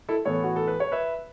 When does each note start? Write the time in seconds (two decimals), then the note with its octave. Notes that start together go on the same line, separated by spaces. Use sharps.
0.09 E4 A4
0.25 A2 E3 B3 A4 C#5
0.44 F#4
0.56 A4
0.68 B4
0.80 C#5
0.92 B4 E5